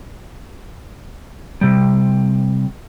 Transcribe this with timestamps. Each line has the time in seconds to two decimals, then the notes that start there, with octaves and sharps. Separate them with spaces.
1.61 C3 G3